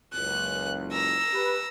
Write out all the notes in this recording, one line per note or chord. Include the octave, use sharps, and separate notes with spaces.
F#1 C#2 F#6
A#5 E6
G4 B4